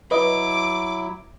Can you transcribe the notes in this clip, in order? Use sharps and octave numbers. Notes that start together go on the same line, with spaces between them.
F#3 E4 B4 D#5 D6